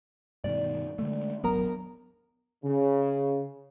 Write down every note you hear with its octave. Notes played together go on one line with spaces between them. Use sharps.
G2 B2 D#3 D5
D3 G#3 A3
D#1 G#1 F#3 B3 A#4 A#5
C#3